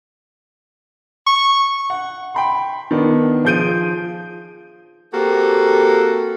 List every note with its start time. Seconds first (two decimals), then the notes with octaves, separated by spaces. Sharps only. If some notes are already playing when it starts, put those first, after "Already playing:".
1.27 C#6
1.90 F#5
2.35 G5 B5 C6
2.91 D#3 B3 D4
3.45 F3 G#4 G6 D7 D#7
5.13 A#3 C4 F#4 G4 A4